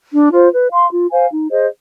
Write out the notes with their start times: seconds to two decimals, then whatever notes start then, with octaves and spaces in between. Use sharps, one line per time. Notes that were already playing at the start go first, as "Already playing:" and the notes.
0.12 D4
0.31 F4 C5
0.51 B4
0.71 F5 C6
0.91 F4
1.11 C5 F5 G#5
1.31 D#4
1.50 G#4 C5 D#5